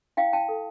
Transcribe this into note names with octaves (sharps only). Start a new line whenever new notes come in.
E4 F5 G5
E4 G5 A5
A4